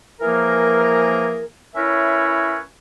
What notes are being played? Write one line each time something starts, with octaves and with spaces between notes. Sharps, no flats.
E3 F3 A#3 G#4 A#4
C#4 E4 A#4 B4 C#5 E5